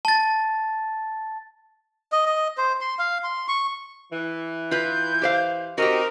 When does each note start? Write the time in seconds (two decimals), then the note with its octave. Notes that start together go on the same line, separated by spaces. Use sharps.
0.05 A5 A6
2.12 D#5
2.26 D#5
2.58 C5
2.81 C6
2.99 F5
3.24 C6
3.48 C#6
4.12 E3
4.71 F4 B4 G6
5.22 G4 C5 F5
5.78 C4 D#4 F#4 G4 A#4